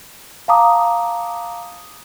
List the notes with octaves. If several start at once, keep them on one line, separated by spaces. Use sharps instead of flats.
F5 A5 A#5 D6 D#6